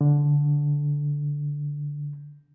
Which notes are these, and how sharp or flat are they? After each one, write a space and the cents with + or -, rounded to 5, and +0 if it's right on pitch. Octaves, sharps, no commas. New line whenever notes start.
D3 -10